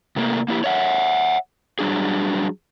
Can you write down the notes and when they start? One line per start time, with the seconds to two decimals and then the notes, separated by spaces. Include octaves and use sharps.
0.16 C3 A3 A#3
0.48 A#3 E4 G4
0.64 C#5 E5 F#5
1.79 F#3 G3 D4 G#4